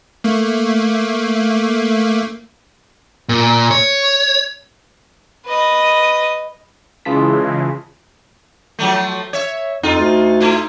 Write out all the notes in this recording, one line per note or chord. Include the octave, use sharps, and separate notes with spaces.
A3 A#3
A#2
C#5
B4 D#5
C#3 E3 G#3 F4 A5 B6
F3 F#3 A3
C#5 E5
F2 D#4 F4
D2
A3 E4 F4